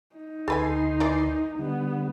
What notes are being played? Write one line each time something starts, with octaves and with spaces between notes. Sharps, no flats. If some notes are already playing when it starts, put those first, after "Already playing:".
D#4
D2 A4 B4 G#5 C6
E3 A#4 D5
D3 G3 B3